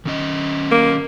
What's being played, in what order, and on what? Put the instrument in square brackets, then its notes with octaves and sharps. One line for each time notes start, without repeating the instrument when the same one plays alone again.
[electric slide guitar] D#3 C#4 D#5
[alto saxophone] A#3